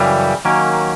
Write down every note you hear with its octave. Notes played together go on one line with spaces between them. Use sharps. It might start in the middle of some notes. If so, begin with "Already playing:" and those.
Already playing: F#2 C#3 E3 G3
D#3 F#3 A#3 C#4